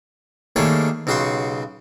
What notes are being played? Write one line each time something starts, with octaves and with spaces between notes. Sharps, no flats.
D#3 G3 A3 A#3 G#4 C#5
B1 C#3 F#4 G4 C6 C#6